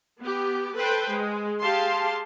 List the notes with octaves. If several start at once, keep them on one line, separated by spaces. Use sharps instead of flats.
B3 G4
A4 B4 C5 G5
G#3
G4 G#4 F5 A5 C6